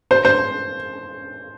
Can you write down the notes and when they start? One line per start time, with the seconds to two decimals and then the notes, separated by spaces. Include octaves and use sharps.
0.11 C5
0.25 C5